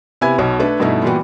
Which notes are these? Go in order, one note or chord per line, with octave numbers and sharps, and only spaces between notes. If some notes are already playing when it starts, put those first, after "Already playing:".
C3 B3 E4 G#5 B5 G#6
B1 B2 C#5
A3 D4 A4 B4
G2 B2 A3 D#4 E4
A#2 E3 G3 B3 F#4 G4